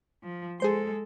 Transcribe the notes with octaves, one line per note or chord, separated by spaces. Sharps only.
F3
G#3 G#4 A4 C5 C6